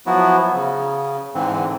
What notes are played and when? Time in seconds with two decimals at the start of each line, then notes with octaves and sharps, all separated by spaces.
0.06 F3 F#3 B3 E4 F#4
0.54 C#3
1.35 G#2 D3 E3 C4